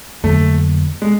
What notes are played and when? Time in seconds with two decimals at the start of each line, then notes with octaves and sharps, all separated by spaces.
0.24 F2 D3 F#3 A3 A#3
1.02 G#3